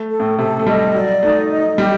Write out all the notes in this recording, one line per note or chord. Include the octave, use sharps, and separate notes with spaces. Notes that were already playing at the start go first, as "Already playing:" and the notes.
Already playing: A3
A4
A2
C3 A4
A3
G3 D#5
F#3 D5
A3 D#4
D#5
G3 G4